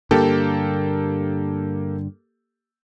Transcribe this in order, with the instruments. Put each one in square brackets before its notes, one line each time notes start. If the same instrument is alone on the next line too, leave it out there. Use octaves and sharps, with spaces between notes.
[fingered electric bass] G2 D3 [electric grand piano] A#3 G4 A4